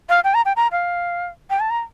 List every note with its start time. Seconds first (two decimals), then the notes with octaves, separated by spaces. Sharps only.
0.09 F5
0.24 G5
0.34 A#5
0.45 G5
0.56 A#5
0.72 F5
1.50 G5
1.60 A5
1.70 A#5